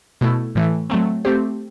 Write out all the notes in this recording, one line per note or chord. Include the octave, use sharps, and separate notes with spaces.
B2 A3 E4
A2 E3 A3
F#3 A3 C4
A3 C4 G4 C5